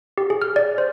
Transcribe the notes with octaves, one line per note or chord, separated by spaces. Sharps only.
G4
G#4
F6
D5
C5